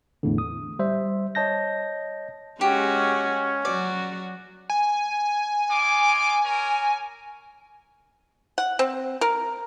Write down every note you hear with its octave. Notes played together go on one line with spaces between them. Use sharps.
E2 A2 D3
D#6
G3 C5 E5
C#5 D#5 A5 G6 A#6
G#3 C#4 F#4 G4
F#3 F#4 D5
G#5
F4 D#5 D6
A#4 C#5
F#5
C4
A#4